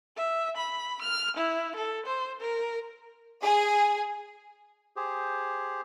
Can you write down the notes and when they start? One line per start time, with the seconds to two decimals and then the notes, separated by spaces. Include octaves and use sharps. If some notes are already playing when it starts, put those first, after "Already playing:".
0.16 E5
0.57 B5
1.01 F6
1.37 E4
1.75 A4
2.06 C5
2.40 A#4
3.42 G#4
4.96 G4 G#4 C5